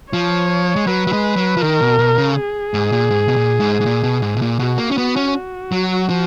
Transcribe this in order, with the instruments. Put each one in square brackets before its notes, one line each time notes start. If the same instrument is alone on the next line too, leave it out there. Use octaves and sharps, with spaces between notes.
[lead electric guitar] F3 [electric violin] C#5
[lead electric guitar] G#3
[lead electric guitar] F#3 [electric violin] B4
[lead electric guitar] F#3
G#3
F#3
F3
[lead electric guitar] D#3 [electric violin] A#4
[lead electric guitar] B2
B2
C#3
[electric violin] G#4
[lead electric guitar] G#2
A#2
G#2
B2
A#2
G#2
G#2
A#2
B2
G#2
B2
A#2
[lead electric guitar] B2 [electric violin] F#4
[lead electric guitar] A#3
C#4
[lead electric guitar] B3 [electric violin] F#4
[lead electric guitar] C#4
[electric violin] F#4
[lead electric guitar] F#3
F3